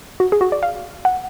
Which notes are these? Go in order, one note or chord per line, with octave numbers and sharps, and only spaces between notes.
F#4
G#4
F#4
D5
F5
F#5